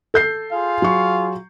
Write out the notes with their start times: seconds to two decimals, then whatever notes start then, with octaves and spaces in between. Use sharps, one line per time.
0.14 A4 G6 C7
0.52 F4 G#4 F5
0.82 F#3 C#6